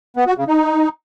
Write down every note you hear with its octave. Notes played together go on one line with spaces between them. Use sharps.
B3
F#4
C#3
D#4